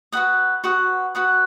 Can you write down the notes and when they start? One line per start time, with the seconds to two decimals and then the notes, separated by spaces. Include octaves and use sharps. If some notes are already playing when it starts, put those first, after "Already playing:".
0.12 F#4 B4 F#5 D#6
0.64 F#4 B4 F#5 D#6
1.15 F#4 B4 F#5 D#6